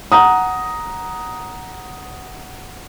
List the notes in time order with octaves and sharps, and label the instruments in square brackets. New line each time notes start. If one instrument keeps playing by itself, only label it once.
[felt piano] F#5 A#5 D#6